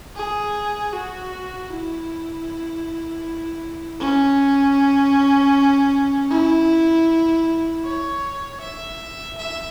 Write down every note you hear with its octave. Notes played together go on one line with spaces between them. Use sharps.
G#4
F#4
E4
C#4
E4
C#5
E5
E5